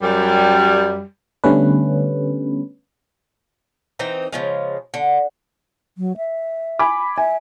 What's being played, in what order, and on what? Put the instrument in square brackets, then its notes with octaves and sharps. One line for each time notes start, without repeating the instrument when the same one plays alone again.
[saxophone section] F#2 G3
[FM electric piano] D3 G3 A3 B3 C#4 B4
[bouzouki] E3 C4 D#4 A#5
C#3 F3 G#3
D3
[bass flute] F#3
E5
[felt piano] G#5 B5 D6
[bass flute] E5 [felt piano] G#5